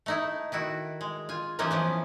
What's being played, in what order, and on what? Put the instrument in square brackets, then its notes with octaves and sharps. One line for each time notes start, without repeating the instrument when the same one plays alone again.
[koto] A3 D#4 E4
D#3 E4 F#4
G#3
F4 G#5
E3 F#3 A#3 C#4 D#4 F4
E3 F3 B3